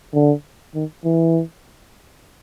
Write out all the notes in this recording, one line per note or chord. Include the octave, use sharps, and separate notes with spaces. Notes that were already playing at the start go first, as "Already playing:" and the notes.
D3
D#3
E3